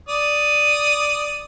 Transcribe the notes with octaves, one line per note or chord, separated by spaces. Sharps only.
D5 D#6